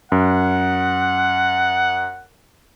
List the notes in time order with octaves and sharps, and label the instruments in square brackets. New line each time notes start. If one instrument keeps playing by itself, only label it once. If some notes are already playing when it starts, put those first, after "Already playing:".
[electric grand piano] F#2 [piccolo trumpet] F#5